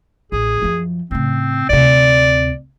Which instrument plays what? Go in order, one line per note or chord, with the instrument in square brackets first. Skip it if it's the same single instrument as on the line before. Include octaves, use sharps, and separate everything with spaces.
[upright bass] A1 [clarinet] G#4
[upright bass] F#2 F3
[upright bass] A2 C#3 [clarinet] C4
[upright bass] D2 C3 [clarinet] D5